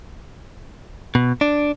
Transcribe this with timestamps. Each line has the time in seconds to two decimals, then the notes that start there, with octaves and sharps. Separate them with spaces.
1.15 B2
1.41 D4